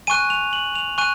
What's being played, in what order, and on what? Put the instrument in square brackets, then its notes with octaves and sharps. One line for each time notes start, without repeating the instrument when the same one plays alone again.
[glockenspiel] G#5 C#6 F#6 D#7
F7
F#7
F7
G#5 C#6 F#6 D#7